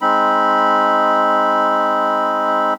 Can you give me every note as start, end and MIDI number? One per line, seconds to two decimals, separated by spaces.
0.01 2.74 56
0.01 2.74 60
0.01 2.74 63
0.01 2.74 83